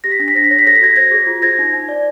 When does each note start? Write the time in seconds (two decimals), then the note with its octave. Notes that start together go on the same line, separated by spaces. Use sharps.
0.04 G4 A#6
0.12 B6
0.20 D4 A#6
0.28 B6
0.35 C5 A#6
0.44 B6
0.50 C#5 A#6
0.59 B6
0.66 A4 A#6
0.75 B6
0.81 F#4 G#6 A#6
0.96 C5 G#6 A#6
1.11 G#4
1.27 F4
1.42 C5 G#6 A#6
1.59 D#4
1.73 D#4
1.89 D5